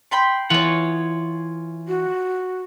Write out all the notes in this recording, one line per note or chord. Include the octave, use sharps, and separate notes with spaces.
G5 B5 C6
E3 F4 C#5 F#5
F#4